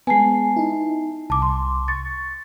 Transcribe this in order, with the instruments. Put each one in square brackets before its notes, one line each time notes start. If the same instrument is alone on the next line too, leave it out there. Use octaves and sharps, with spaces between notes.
[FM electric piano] G#3 B3 [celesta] G#5 A5 C7
[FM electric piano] D#4 E4
[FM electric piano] C2 [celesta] A5 D6
[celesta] C6
[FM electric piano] C#6 [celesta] A6